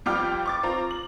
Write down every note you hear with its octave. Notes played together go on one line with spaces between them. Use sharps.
F2 G3 F4 G5 D6 F6
C#6 D6 A6
C4 F4 A#5
F#7